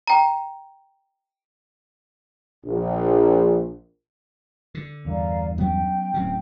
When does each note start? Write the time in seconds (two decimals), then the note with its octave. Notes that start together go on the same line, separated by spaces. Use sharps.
0.07 G5 A#5
2.64 A#1
4.75 D3
5.05 E2 G2 A#4 D5 F5
5.58 F#3 B3 C#4 G5
6.14 D1 A2 F#3 C4 C#4